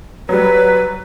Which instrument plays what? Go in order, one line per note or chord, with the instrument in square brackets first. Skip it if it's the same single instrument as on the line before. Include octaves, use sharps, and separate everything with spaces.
[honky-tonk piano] F#3 G3 [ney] B4